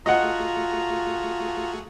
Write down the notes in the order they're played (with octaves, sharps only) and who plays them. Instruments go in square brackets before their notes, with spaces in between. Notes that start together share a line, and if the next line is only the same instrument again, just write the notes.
[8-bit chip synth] A3 F#4 G#4 [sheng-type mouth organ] F4 A#5 [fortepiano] D#5 F#5